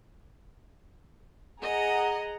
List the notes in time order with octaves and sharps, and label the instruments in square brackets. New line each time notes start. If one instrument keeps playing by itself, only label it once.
[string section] G#4 F#5 A#5 [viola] D#5